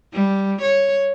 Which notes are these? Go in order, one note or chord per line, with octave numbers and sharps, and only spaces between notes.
G3
C#5